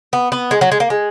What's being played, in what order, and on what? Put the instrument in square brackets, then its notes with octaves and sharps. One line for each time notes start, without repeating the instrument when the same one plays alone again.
[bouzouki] B3
B3
G#3
F#3
G#3
A#3
G#3